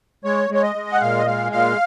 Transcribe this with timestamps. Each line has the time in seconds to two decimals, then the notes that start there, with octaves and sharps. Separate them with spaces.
0.24 G#3 C#5
0.50 G#3 C#5
0.63 D#5
0.75 G#3
0.92 F#5
1.01 A#2 F5
1.18 D#5
1.26 G#3 F5
1.52 A#2 F5